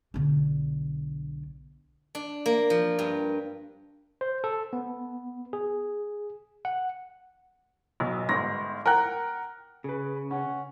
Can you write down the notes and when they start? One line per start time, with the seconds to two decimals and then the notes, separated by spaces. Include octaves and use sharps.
0.14 B1 D3
2.15 D4
2.46 A#3
2.70 F3
2.99 G2
4.21 C5
4.44 A4
4.73 B3
5.53 G#4
6.65 F#5
8.00 E1 B1
8.29 G1 G#2 A#6
8.86 A#4 F#5 G5 F#6
9.84 C#3 G#4 B4
10.31 C#4 F#5